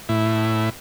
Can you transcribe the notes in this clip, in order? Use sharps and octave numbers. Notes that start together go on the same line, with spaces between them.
A2 E4